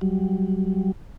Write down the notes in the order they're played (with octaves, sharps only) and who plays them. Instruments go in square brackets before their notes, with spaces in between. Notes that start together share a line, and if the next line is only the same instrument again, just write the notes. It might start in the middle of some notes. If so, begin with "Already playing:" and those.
[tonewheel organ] F#3 G3